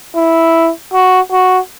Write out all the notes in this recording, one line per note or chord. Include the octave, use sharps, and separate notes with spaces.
E4
F#4
F#4